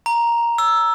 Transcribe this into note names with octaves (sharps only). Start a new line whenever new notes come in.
A#5
E6